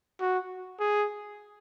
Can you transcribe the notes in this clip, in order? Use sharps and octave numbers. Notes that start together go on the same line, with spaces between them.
F#4
G#4